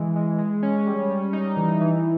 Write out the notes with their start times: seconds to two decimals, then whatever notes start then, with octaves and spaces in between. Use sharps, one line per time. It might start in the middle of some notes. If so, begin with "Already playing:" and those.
Already playing: E3 G#3
0.16 G#3
0.39 G#3
0.63 C#4
0.87 G3
1.10 G3
1.33 D#4
1.57 E3
1.81 E3